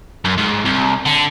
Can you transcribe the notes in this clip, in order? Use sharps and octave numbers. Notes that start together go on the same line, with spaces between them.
F#2
G#2
C2
D3